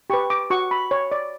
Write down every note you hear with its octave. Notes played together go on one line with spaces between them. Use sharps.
G4 B4 C#6
D6
F#4 C#6
B5
C#5
D5